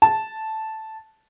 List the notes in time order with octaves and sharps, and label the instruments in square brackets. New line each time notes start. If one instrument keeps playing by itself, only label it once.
[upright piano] A5